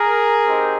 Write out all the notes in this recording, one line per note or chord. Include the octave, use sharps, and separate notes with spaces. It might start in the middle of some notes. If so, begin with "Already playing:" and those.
Already playing: G#4 A#4
C4 D#4 G4